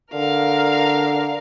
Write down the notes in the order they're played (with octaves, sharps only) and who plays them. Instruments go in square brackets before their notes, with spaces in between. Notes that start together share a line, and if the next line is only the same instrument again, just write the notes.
[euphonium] D3 [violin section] A#4 F6 [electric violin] F5